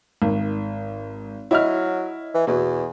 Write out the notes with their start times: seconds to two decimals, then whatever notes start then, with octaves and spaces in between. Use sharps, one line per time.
0.22 G#1 D#3
1.51 F#3 E4 D#5 F6
2.34 E3
2.47 E2 B2